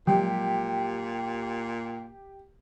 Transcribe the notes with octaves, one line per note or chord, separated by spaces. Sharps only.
A#2 F3 F#3 G#3 G4